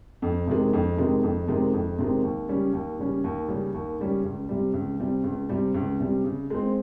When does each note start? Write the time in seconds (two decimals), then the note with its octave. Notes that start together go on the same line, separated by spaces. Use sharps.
0.22 F2
0.47 C3 D#3 G#3
0.73 F2
0.98 C3 D#3 G#3
1.23 F2
1.48 C3 D#3 G#3
1.73 F2
1.99 C3 D#3 G#3
2.24 D#2
2.48 C#3 G3 C#4
2.73 D#2
2.99 C#3 G3 C#4
3.24 D#2
3.48 C#3 G3 C#4
3.74 D#2
3.99 C#3 G3 C#4
4.24 C#2
4.49 C3 G3
4.74 C#2
5.00 C3 G3
5.24 C#2
5.49 C3 G3
5.75 C#2
6.00 C3 G3
6.24 C#3
6.50 G#3 C4